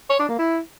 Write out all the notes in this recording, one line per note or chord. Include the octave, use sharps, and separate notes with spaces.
C#5
D4
A#3
E4